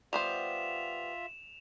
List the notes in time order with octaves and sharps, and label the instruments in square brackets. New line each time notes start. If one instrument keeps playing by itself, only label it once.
[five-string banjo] G3 B3 C5 [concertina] F4 E5 [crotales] E7 F7